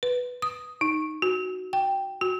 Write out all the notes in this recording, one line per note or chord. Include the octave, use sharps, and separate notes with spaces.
B4
D#6
D#4
F#4
G5
F#4